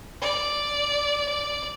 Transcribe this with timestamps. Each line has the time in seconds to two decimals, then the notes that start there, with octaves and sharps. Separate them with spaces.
0.22 D5
1.29 D5